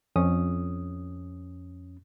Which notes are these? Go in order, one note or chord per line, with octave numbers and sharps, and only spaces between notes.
F2 C#4 D#6